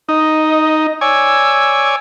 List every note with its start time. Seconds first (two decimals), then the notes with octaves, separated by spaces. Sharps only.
0.09 D#4 D#5
1.01 C#5 D5 G#5 E6